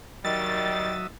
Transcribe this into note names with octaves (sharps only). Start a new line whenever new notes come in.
D#3 F#3 G3 E5 D#6 A6